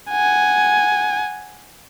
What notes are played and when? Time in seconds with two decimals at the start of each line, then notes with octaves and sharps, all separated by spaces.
0.10 F#5 G#5